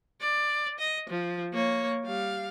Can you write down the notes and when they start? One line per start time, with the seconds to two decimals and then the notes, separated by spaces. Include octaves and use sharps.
0.21 D5
0.79 D#5
1.10 F3
1.53 A#3 C#5
2.05 G3 F5